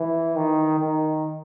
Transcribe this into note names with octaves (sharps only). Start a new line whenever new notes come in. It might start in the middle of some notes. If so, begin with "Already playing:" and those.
Already playing: E3
D#3
D#3